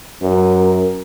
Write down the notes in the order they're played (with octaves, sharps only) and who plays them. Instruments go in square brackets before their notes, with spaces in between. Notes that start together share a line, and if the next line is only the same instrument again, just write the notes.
[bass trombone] F#2 [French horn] A#4